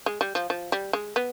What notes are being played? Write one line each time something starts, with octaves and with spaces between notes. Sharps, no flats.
G#3
G3
F3
F3
G3
G#3
B3